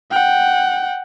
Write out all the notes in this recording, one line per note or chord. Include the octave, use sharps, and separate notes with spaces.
F#5 G5